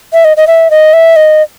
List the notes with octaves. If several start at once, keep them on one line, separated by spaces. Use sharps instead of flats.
E5
D#5
D#5
E5
D#5
E5
D#5